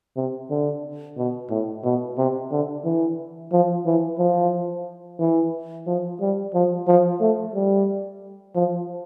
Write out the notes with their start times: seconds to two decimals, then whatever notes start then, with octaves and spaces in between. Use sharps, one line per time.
0.16 C3
0.50 D3
1.17 B2
1.50 A2
1.84 B2
2.18 C3
2.51 D3
2.85 E3
3.52 F3
3.86 E3
4.19 F3
5.20 E3
5.87 F3
6.21 G3
6.54 F3
6.88 F3
7.21 A3
7.55 G3
8.55 F3